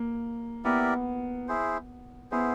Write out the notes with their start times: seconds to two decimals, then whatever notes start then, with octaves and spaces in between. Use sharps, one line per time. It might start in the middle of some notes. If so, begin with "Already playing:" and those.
Already playing: A#3
0.65 B3 E4 G4 A#4 D5
1.48 E4 G#4 C5
2.31 B3 E4 G#4 C5